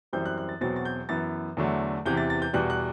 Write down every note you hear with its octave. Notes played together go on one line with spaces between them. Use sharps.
F#2 E3 G3 C4 G6
F#6
F#6
A6
E2 B2 F#3 C4 A6
A6
G6
F#2 E3 B3 A6
E2 D3 F#3 A3
E2 C3 E3 G6
A6
A6
G6
E2 B2 G3 F#6
F#6